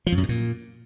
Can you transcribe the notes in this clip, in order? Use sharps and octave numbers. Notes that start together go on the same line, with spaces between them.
F3
F2
F#2
G#2
A#2